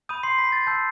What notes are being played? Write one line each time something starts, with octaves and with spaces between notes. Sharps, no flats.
B5 D#6 G6 D#7
C6 C7
B5 B6
A6
A5 E6 G6